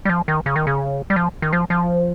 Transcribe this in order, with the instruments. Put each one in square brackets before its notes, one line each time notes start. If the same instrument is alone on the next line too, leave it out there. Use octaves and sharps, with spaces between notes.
[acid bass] G3
F3
D#3
C#3
D#3
C#3
G3
F3
D#3
F3
F3